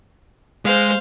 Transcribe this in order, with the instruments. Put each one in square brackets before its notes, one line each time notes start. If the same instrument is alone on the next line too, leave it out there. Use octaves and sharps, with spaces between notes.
[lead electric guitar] G#3 [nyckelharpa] C5 F5